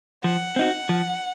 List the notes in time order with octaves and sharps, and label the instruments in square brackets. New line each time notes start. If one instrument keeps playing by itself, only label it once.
[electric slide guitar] F3 [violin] F#5
[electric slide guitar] C4 D#4 F#4
F3